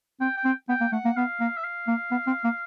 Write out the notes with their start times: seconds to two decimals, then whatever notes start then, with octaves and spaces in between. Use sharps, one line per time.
0.20 C4 G5
0.37 G5
0.45 C4
0.69 B3 G5
0.81 A#3
0.92 A3 F#5
1.05 A#3
1.16 B3 F5
1.40 A#3
1.57 E5
1.64 F5
1.87 A#3
2.11 B3
2.27 C4
2.44 A#3